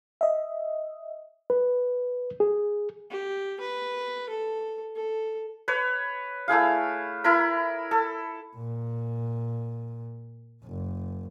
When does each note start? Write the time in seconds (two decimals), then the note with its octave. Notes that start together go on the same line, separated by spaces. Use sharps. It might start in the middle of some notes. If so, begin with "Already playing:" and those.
0.21 D#5 E5
1.50 B4
2.40 G#4
3.10 G4
3.60 B4
4.29 A4
4.96 A4
5.68 B4 C#5
6.48 A3 E4 G#4 F5
7.24 E4 A#4 B5
7.91 A4
8.56 A#2
10.64 F#1